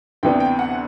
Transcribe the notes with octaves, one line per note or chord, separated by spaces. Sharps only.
D2 C3 E3 B3 D4 G5
G5
F#5